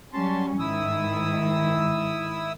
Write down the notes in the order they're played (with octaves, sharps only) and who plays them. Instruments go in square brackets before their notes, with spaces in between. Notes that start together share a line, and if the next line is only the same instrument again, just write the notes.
[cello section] F#3 G3 C#4 [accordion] A5 C6
[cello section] G#2 D#3 [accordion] E4 D#6 E6